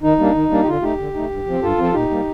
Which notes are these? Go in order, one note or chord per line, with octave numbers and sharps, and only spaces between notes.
D#3 D#4
G3 A#3 D4
D#3
G3 A#3 D4
G4
D3 F4
A3 D#4 G4
D3
A3 D#4
G2
F3 C4
G2 F4 A4
F3 C4 A4
A#2 D#4 G4
G3 A#3